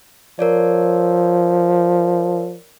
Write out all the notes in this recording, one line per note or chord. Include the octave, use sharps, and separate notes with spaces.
F3 A#4 C#5 D5